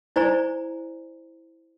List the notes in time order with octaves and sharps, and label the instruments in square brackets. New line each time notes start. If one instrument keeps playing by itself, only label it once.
[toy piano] E4 C5 D5 G#5 A#5